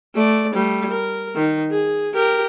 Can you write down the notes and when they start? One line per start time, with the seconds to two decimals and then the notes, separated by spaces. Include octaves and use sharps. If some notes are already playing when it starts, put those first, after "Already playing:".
0.15 A3 D5
0.54 G3 A3
0.90 A#4
1.35 D#3
1.71 G#4
2.14 G4 A#4